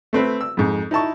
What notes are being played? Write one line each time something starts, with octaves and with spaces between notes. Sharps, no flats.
A3 C4 B4
E6
F2 G#2
D#4 E4 A5 C#6